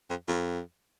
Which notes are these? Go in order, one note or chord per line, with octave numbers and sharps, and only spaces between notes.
F2
F2